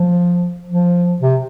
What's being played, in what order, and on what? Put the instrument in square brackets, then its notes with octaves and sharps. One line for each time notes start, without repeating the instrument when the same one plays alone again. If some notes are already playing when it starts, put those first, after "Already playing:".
Already playing: [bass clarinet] F3
F3
C3